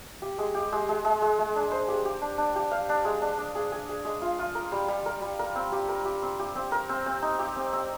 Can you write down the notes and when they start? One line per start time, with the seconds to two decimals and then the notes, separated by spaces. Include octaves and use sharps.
0.22 G4
0.38 G#3
0.55 G4
0.72 G#3
0.89 G#3
1.05 G#3
1.22 G#3
1.39 G#3
1.56 D4
1.71 C5
1.88 G4
2.05 G4
2.22 D4
2.38 D4
2.56 G4
2.71 F5
2.89 D4
3.05 G#3
3.22 D4
3.38 D4
3.55 G#4
3.72 G#4
3.89 G#4
4.05 G#3
4.22 F4
4.39 F4
4.55 A#4
4.72 G3
4.88 G3
5.06 A#4
5.22 G3
5.39 A#4
5.55 C4
5.72 G4
5.89 A#4
6.05 G4
6.22 C4
6.39 G4
6.55 C4
6.72 A#4
6.89 C4
7.06 C4
7.22 D#4
7.39 G4
7.56 C4
7.73 C4